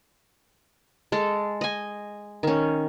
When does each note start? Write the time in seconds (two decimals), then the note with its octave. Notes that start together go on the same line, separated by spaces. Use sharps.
1.12 G#3 A4
1.61 D#5 G#5
2.43 D#3 C#4